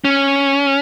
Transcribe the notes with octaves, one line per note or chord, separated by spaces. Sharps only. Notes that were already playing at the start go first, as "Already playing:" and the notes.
C#4